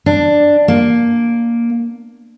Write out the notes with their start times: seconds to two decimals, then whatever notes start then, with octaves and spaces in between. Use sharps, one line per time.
0.06 D4
0.68 A#3